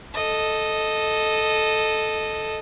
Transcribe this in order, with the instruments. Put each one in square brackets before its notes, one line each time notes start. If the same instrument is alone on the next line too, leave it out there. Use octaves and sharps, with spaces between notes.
[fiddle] A4 D#5